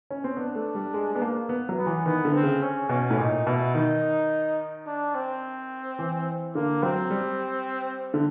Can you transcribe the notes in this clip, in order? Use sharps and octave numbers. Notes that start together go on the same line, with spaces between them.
C#4
C4
B3 D4
A3
G3
G#3
B3
A#3
B3
F#3
B3
E3
D#3 B3
D3
C4
C#3
C#4
B2 C#4
A2
A#2 D#4
B2 E4
D#3 D#4
D4
C4
E3
D3 A#3
F#3 C4
G3
D3